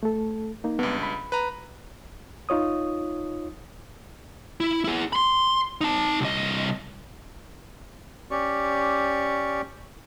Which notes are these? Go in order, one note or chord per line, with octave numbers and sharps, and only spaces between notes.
A3 A4
A#3 D#4
C#2 G2 B3 B4
B5
B4 A#5
D#4 F4 C#5 D#6
E4
E4 G#4
B5 C6
D#4 A5
C2 D#5
C#4 G4 D5 C#6